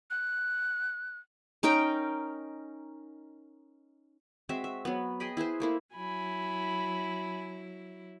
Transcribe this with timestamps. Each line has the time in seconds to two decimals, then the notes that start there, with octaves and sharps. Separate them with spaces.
0.10 F#6
1.63 C#4 D#4 A#4 G5
4.49 G#3 C4 F#4 E5
4.64 E5
4.85 F#3 B3
5.20 G#4 D#5 G5 B5
5.37 E4 G#4 B4 C5
5.60 A3 A#3 E4
5.95 F#3 E4 G#5 B5